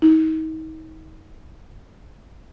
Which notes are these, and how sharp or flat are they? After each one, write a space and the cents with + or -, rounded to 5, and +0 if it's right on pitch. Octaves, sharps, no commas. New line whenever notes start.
D#4 +35